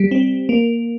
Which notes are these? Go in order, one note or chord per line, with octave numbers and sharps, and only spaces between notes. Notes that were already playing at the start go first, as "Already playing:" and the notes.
Already playing: G3
C4
A#3